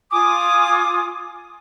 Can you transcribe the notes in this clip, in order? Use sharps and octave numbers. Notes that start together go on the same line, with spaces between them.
F4 G#5 D6 D#6